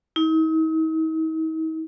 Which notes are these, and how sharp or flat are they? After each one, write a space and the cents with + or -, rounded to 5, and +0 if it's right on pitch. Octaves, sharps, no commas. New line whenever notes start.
D#4 +45